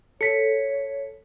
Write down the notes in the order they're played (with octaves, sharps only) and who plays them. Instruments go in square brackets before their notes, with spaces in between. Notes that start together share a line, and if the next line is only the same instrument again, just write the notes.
[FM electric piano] A4 [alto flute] C#5 [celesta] B6 C#7